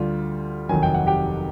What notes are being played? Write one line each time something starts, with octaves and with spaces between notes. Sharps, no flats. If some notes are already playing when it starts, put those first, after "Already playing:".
Already playing: D2 D3 G3 F4
F1 D#2 D#3 F#3 G#5
G5
F#5
G4 G5